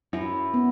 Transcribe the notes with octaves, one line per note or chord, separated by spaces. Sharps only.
F#2 E4
B3